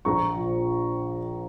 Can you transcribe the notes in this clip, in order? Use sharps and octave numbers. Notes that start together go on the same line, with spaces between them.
A#1 A#5 C#6
A#2 F3